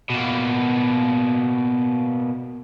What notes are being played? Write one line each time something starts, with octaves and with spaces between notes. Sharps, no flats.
B2 A#3